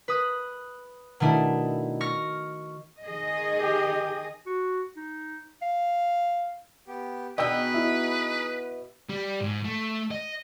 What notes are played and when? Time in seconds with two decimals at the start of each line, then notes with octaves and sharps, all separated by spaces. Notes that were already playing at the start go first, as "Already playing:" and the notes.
0.08 B4 D#6 F#6
1.20 B2 D#3 A3 D4 E4
2.01 C#6 F6 A#6
3.01 D#3 G#4 D#5
3.60 G4
4.46 F#4
4.96 D#4
5.62 F5
6.87 B3 G4
7.38 B2 B3 D#4 G#4 B4 D#5 G5 E6
7.74 E4
9.09 G3
9.41 G#2
9.65 A3
10.11 D#5